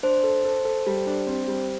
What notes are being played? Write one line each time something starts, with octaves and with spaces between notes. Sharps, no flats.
D4 C5
A4
A4
A4
G3
D4
C4
G3